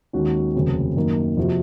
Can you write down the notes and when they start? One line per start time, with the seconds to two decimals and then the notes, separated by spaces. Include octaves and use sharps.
0.13 D#2 D#3 G#3 C#4 F#4
0.54 F1 D#2 C#3 F#3 C4
0.95 F#2 D#3 A#3
1.37 F2 C3 F3 C4 F#4